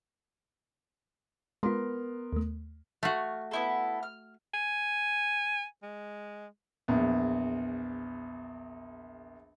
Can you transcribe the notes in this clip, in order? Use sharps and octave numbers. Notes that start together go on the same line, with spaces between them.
G#3 B3 F4 A#4 C6
D#2 A3
A3 F#4 F6
B3 E4 A4
F6
G#5
G#3
A#1 E2